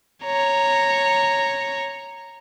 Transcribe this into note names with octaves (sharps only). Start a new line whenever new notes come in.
C#5 A#5